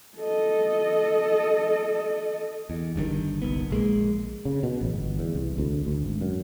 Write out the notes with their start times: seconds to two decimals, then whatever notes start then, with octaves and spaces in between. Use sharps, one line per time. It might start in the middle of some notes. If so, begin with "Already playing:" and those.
0.18 A4 D#5
2.70 E2
2.96 G1 G2 B2 D#3
3.42 G1 C2 B3
3.70 A#1 G#3 A#3
4.45 C#3
4.63 B2
4.81 A1
4.94 G1
5.19 E2
5.35 C2
5.58 D2
5.87 D2
6.04 G#1
6.21 F#2